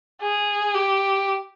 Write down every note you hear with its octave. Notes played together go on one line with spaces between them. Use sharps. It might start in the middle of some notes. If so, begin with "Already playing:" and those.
G#4
G4